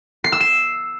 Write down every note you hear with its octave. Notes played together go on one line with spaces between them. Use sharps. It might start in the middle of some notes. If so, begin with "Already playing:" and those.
C7
E6
E7